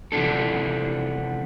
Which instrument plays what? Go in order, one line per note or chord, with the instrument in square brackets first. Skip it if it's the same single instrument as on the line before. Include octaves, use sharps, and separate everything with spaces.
[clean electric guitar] C3 E3 F3 B3 D4 A4